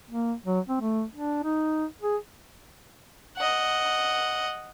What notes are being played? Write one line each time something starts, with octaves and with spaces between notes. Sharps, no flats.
A#3
F#3
C4
A3
D4
D#4
G#4
D#5 F#5